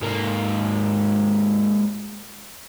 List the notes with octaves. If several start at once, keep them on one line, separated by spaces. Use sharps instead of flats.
G#2 A#3